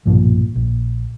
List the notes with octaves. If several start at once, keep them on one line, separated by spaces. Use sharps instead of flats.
B1 G2 A#2 F3
A#1